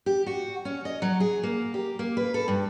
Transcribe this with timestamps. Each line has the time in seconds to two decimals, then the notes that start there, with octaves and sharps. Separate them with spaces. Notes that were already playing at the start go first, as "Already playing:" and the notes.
0.06 G4
0.26 F#4
0.65 C#4
0.85 D#5
1.02 F#3
1.20 G#4
1.43 A#3
1.74 G4
1.99 A#3
2.17 B4
2.34 A4
2.48 G2